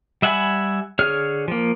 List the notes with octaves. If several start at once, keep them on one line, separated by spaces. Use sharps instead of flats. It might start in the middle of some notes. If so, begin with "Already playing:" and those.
G3 E5 F#5 G#5 B5
D3 G#4 C#5 F6
F3 A#3